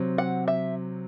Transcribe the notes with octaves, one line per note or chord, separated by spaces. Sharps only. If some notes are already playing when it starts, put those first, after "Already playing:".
Already playing: C3 F#3 C4
F#5
E5